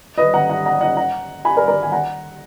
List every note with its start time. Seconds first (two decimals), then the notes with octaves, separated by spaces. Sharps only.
0.18 B4 D#5
0.34 F#5 A#5
0.50 F#5 A#5
0.66 F#5 A#5
0.81 D#5 F#5
0.97 F#5 A#5
1.45 G#5 B5
1.56 A#4 D5
1.68 A#4 D5
1.83 G#5
1.92 F#5 A#5